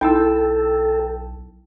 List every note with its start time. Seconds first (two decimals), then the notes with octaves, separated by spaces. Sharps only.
0.01 B1 D#4 E4 A4 G5 A5 E6